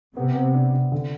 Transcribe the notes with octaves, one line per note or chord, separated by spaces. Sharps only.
C3 B3
B3
D4
D4
D3